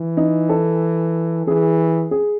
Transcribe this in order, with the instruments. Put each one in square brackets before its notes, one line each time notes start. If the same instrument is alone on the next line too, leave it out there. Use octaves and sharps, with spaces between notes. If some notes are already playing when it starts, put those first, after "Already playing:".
Already playing: [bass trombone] E3
[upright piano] D#4
A4
[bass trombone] E3 [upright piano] G#4
[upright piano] G#4